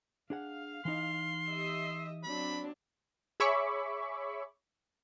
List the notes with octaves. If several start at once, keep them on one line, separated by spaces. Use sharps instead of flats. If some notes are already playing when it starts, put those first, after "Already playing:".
D4 G#4 F5 F#5
E3 D#4 C6
G4 D#5 E5
F#3 C4 D4 B5
G#4 C#5 E5 B5 C#6 D6